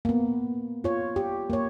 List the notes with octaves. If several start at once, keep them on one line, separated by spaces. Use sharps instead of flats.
A#3 B3
F4 C#5
G4
A#3 C#5